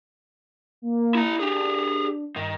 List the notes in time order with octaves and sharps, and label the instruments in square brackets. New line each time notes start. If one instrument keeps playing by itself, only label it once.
[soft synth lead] A#3
[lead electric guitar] E4 A#5
[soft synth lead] D4 [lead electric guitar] G4 G#4
[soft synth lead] G2 [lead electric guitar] D#3